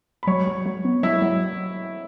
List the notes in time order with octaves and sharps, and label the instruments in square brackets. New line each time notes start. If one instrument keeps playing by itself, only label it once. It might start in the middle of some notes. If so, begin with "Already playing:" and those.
[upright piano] B5
[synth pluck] F#3 [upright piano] C#5 C#6
[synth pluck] F#3
F#3
B3
[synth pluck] F#3 [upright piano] E4 E5
[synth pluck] F#3